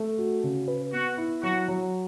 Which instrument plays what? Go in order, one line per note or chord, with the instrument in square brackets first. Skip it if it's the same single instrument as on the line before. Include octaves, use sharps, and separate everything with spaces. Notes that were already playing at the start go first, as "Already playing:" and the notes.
Already playing: [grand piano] A3
F#4
C#3
B4
[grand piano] B3 [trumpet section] F#4
[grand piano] E4
[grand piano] F#3 [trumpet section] F#4
[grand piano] F#3